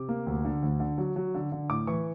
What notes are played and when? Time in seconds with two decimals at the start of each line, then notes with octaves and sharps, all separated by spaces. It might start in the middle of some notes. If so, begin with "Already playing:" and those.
Already playing: C3 D6
0.09 A#3
0.26 D2
0.45 D3
0.62 D2
0.80 D3
0.98 F#3
1.16 F#3
1.34 D3
1.52 D3
1.70 A2 D6
1.87 E3 C#6